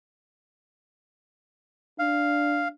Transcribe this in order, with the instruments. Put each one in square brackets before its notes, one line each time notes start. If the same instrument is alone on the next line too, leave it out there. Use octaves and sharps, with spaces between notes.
[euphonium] D4 [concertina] F5